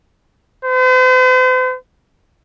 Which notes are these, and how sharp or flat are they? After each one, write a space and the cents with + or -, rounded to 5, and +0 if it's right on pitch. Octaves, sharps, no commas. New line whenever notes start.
C5 -45